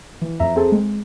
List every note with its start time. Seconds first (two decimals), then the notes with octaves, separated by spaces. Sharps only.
0.22 E3
0.40 F2 E5 A#5
0.56 C4 G#4 A4
0.72 G#3